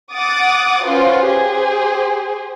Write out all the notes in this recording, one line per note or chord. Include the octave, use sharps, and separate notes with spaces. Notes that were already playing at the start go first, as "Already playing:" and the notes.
F#5 D6 D#6 A6
C#4 F4 F#4 B4 C5
G4 G#4 C5